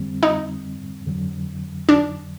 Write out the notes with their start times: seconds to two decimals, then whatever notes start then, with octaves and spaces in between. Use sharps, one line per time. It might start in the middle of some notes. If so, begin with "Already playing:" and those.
Already playing: F2 D3 G3 C4
0.23 D#4
1.07 F2 D3 F#3
1.89 D4